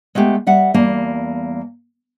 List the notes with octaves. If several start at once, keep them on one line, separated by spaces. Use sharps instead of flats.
G#3 A3 B3 G4
G3 E5 F#5
E2 G3 A#3 A5